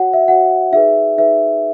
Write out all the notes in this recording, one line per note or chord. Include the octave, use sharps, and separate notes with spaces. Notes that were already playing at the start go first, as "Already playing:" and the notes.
Already playing: F#4 C#5 F#5
E5
F#4 C#5 F#5
D#4 G#4 B4 E5
D#4 G#4 B4 E5